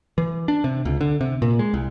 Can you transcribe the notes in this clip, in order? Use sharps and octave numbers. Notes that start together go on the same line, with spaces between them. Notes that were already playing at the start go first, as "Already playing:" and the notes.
E3
D4
C3
C#2
D3
C3
A#2
G#3
C2